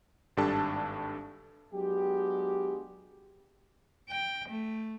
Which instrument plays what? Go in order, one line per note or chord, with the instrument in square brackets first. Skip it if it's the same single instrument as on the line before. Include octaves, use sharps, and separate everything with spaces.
[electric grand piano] G#1 G2 D4 G4 A4 A5
[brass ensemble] F#3 G#3 B3 D4 G4
[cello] G5
A3